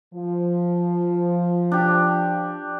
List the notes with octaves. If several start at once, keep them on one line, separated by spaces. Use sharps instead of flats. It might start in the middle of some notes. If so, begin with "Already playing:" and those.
F3
D4 G4